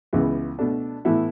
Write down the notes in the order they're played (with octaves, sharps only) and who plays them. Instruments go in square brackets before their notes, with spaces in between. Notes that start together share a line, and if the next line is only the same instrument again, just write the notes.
[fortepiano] C#2 C#3 E3 B3
B2 A3 D4
A2 E3 B3 E4